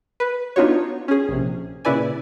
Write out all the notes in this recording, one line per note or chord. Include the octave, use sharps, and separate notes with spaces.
B4
B3 D4 D#4 F4 F#4 C#5
C#4 G#4
A#1 C3
A#2 C#3 E4 B4 D5 G#5